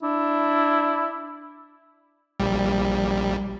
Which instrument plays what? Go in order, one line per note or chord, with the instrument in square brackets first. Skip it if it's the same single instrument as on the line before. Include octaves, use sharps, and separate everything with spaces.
[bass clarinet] D4 [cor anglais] E4
[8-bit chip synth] A#1 G3